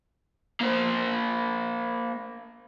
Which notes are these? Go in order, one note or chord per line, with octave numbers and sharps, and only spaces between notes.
A#3 C5